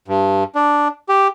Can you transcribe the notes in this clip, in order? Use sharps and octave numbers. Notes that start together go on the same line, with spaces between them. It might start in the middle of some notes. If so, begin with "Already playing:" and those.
G2
D4
G4